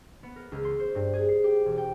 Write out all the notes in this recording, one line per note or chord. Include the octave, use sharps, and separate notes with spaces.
B3
A#4
C#2
C6
C5
G2
G#4
C7
G4
E1
G5